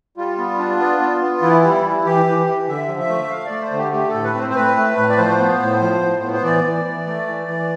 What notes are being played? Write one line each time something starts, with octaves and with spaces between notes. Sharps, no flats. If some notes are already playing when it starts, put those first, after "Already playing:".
G3 F4
B3
D4
B3
B3
B3
E3 E4
G3
E3
E3 G4
E3
E3
D3 E5
F3
E5
A3
A3 F5
A3 D5
C5
D3
G4
A3 G4
A4
A2
B4
C4 C5
C5
A2 B4
A3
A2
D5
F3 C5
B3
A2
F3
A2
B3
C5
E3 D5
E3
E3
A3
E3
E3